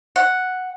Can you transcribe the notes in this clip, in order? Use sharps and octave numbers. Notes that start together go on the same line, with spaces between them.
F#5